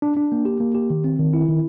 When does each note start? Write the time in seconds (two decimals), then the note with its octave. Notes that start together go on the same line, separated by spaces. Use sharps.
0.02 D4
0.17 D4
0.32 A#3
0.45 G4
0.60 A#3
0.75 G4
0.90 D#3
1.04 C4
1.19 D#3
1.33 E4
1.49 D#3